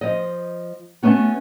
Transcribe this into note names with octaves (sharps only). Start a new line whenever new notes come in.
F3 D#5
A3 B3 C#4 F#4